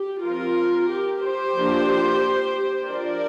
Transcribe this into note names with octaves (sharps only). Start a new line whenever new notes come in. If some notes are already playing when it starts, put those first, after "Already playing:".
Already playing: G4
F3 C4 F4 A#4
G4
G4 C5
F3 A#3 D4
F3 D4 A#4 D5